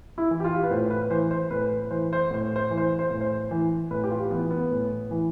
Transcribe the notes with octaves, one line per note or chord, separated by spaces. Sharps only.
E4
E3
G4
F4
B4
A2 C5
B4
E3 C5
C5
A2 B4
E3 C5
C5
A2 C5
C5
E3
C5
C5
A2
C5
E3
A2 B4
G4
F4
E3 B3
B3
A2
E3